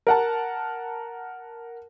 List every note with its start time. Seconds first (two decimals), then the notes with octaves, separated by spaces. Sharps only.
0.07 A#4 F#5 A5